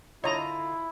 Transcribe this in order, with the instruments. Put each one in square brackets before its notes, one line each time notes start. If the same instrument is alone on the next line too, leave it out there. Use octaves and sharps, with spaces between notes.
[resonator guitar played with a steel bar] D3 F4 [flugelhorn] E4 [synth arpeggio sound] C#5 [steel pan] D#5 A#5